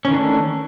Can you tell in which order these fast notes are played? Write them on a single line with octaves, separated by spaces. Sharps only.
C#4 E3 D#3 D4 A3